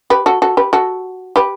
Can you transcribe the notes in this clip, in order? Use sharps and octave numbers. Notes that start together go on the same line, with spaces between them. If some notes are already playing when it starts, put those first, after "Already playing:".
G4 B4
F#4 A4
F#4 A4
G4 B4
F#4 A4
G4 B4